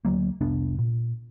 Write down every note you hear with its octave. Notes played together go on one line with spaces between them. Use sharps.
D2 F#3 A#3
F1 C2 B3 D4
A#2